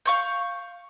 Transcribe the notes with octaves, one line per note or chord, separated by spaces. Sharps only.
F5 C#6 G6